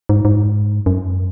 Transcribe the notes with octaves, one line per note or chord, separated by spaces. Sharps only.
G#2
G#2
F#2